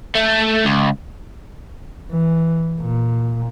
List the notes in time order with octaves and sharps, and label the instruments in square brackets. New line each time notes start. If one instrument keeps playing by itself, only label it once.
[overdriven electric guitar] A3
C#2
[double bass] E3
A#2